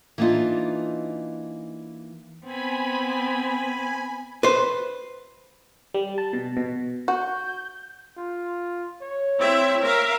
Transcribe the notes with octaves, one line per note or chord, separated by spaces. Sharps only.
E3 A#3 D4 D#4 F4
B3 C4 G#5 B5
B4 C5
G3
A5
B2
B2
F#4 G6
F4
C#5
C4 E4 E5
A#4 E5 F5